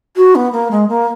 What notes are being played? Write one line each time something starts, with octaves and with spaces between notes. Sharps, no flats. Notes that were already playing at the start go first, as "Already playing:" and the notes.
F#4
B3
A#3
G#3
A#3